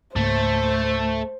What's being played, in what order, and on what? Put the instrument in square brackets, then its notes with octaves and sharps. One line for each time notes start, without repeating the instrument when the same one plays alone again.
[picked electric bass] C#2 G#2 A#3 [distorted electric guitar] A3 [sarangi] C5